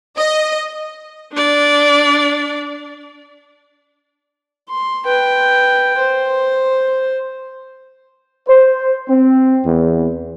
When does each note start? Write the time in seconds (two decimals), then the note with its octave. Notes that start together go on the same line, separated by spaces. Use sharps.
0.17 D#5
1.33 D4 D5
4.69 C6
5.05 B4 G5
5.99 C5
8.47 C5
9.09 C4
9.64 E2